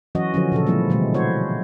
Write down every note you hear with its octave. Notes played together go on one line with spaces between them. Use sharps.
E3 F#3 C#4 F#4 D#5
D3 F3 F#3 C#4
A#2 C#3 F3 A4
F3 G3 G#3 A#3 C4 E4
B2 D3 E3 G#3 A3
E4 F#4 C5 C#5